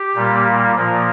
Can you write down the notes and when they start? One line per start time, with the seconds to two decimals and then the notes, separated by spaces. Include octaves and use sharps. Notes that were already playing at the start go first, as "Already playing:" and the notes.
Already playing: G4
0.15 A#2 G3 A#3
0.75 A#2 F3 A#3